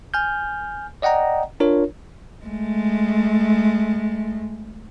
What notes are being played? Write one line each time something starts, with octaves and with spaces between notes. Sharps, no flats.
G#5 F6 G6
D5 D#5 F#5 G5 A#5
D4 F4 A#4 C#5
G#3 A3